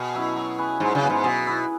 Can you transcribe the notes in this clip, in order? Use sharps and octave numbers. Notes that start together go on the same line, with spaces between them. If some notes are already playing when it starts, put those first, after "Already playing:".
Already playing: B2 B3 G#4
F#3 C#4 E4
F#3
B3 G#4 B4
G#2 F#3
C#3
B3 G#4 B4
G#2
B2 F#3
E4 B4